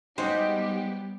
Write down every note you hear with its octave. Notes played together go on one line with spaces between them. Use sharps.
G3 G#3 B3 D#4 F#4 G4 C5 C#5